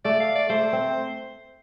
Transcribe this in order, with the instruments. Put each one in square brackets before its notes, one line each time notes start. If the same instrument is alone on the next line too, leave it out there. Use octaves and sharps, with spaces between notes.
[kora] A3 [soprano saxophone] D5
[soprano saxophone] F5
D5
[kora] A3 [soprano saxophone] C5
[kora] C4